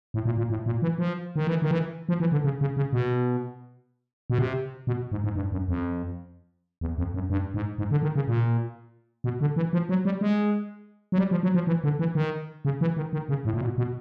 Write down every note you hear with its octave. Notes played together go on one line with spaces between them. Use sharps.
A2
A#2
A#2
A2
A#2
E3
F3
D#3
E3
D#3
E3
F3
E3
D3
C#3
C#3
C#3
B2
B2
C3
B2
G#2
G#2
G2
F#2
F2
E2
F2
F#2
G2
G#2
G#2
D3
D#3
C#3
A#2
B2
D3
E3
F3
F#3
G3
G#3
F#3
G3
F3
F#3
F3
E3
D3
E3
D#3
C#3
E3
D#3
D#3
C#3
A2
A#2
B2
B2